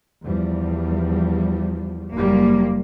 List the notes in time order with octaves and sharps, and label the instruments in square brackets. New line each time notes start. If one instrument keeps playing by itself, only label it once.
[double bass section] E2 F3 G3
[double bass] F#1 G3 [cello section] A#3